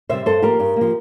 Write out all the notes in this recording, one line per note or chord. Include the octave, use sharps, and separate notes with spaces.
C3 G3 C5 E5
G2 A4 C5
F3 A#3 G4 A#4
G2
F3 A#3